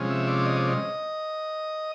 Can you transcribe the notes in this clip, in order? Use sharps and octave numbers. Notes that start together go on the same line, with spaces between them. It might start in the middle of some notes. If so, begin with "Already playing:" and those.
Already playing: C3 F3 G#3 C#4
E5
D5
D#5
D5
D#5